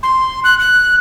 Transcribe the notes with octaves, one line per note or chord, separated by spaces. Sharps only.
C6
F#6
F#6